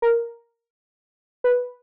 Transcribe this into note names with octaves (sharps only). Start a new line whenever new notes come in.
A#4
B4